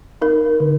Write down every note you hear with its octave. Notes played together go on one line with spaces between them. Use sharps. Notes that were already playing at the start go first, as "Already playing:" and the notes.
D#4 A#4
D3